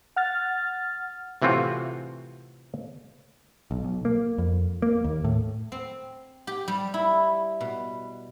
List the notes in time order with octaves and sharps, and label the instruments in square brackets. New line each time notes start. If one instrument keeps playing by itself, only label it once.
[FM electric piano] F#5 F6 A6
[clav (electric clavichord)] A2 C3 E3 C4 F4 F#4
[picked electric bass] B1
B1
A#3
F2
A#3
D#2
A2
[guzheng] C4
G4
G3
E4
B2